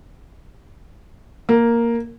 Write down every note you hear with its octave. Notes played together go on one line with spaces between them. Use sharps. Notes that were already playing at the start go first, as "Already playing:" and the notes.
A#3